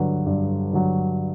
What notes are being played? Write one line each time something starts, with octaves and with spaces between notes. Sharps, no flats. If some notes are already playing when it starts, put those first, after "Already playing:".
Already playing: G2 D3 F#3 B4
G2
D3 F#3